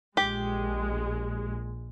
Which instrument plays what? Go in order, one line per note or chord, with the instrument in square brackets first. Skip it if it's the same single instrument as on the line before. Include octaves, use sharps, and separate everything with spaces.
[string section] A#1 G#3 [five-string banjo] G4